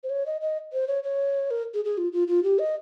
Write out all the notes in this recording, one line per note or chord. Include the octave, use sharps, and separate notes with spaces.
C5
C#5
D#5
D#5
C5
C#5
C#5
A#4
G#4
G#4
F4
F4
F4
G4
D#5